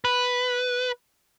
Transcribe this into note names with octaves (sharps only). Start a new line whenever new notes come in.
B4